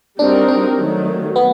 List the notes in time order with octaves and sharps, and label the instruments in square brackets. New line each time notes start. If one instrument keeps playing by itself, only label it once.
[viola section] G3 C4 D#4 F#4 A#4 [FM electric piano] D4
[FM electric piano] D4
[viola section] D#3 F#3 A3
[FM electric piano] B3